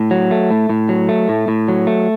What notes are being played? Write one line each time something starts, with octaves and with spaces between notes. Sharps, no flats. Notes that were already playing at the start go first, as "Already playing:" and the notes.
Already playing: A2
F#3
A3
A2
A2
F#3
A3
A2
A2
F#3
A3